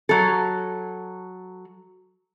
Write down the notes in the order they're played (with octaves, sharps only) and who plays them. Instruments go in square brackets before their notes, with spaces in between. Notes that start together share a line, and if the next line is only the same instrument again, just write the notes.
[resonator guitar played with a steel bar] F#3 A4